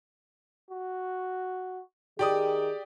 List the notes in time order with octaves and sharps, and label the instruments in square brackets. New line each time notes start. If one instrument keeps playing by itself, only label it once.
[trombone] F#4
[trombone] D#3 [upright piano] G4 D5 D#6 [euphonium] G#4